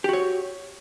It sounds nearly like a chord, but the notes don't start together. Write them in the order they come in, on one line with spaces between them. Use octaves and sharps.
G4 F#4 C#5